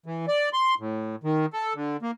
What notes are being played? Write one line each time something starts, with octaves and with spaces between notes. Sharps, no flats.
E3
D5
C6
A2
D#3
A4
D3
A#3